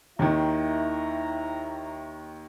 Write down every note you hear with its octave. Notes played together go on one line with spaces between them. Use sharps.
D#2 D#3 E4 E5 A#5